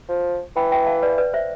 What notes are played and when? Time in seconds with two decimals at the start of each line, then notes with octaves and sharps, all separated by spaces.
0.09 F3
0.56 E3 G5 B5
0.72 E5 G5
0.86 F5 A5
1.02 B4 D5
1.18 B4 D5
1.33 C5 E5